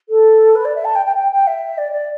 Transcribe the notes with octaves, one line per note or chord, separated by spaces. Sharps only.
A4
B4
D5
E5
A5
G5
G5
G5
G5
E5
D5
D5